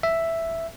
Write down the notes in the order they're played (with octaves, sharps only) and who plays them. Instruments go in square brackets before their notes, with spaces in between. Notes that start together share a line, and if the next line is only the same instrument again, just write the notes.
[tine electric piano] E5